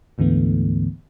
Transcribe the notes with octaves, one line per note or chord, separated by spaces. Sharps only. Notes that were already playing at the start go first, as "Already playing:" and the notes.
D2 G#2 D3 E3 A3 B3